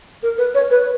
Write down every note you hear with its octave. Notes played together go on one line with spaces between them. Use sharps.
A#4
B4
C#5
B4